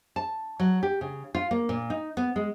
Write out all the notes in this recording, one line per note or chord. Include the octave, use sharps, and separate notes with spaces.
A5
F#3
G4
C#3
F4
A#3
A#2
D#4
B3
G#3